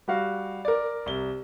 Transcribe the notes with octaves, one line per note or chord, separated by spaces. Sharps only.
G3 F#4 F5
A#4 D5
C2 G7